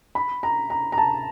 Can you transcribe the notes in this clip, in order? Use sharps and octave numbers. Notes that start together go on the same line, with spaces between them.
B5
A#5
A#5
A#5
A5